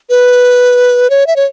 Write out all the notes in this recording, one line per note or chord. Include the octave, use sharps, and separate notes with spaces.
B4
C#5
E5
C#5